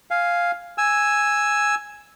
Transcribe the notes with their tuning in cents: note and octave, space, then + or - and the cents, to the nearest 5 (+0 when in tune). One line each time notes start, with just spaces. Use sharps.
F5 +0 G#5 +0
G#5 +0 E6 +0